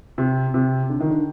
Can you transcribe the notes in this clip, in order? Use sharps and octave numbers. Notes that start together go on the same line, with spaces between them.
C3
C3
D3
D#3
D3